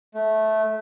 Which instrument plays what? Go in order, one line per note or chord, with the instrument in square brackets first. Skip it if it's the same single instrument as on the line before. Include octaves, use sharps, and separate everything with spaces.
[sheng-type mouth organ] A3